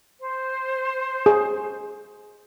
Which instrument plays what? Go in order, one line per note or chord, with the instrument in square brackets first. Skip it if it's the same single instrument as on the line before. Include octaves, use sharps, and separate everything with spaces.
[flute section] C5
[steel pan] G#4